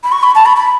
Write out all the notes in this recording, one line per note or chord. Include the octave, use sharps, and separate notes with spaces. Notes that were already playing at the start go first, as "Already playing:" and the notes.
B5
C#6
B5
A5
B5
B5